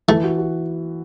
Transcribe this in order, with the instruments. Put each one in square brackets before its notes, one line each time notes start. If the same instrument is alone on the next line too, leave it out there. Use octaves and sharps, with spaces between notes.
[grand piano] E3 [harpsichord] A3
[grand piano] F#4
F#4